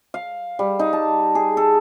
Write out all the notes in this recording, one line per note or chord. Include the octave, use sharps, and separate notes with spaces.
F5
G3
D#4
A5
G#4
A4